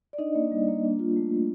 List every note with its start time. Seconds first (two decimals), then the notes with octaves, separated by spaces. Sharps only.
0.13 D5
0.18 D4 D#4 D#5
0.35 A#3
0.52 G3
0.68 A#3
0.84 D4
0.99 F4
1.16 A3
1.32 A3